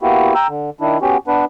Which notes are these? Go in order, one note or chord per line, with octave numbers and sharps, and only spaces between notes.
A#3 B3 E4 F#4 G4
G5 A#5 E6
D3
D#3 D4 E4
B3 C#4 F#4 G4
B3 D4 B4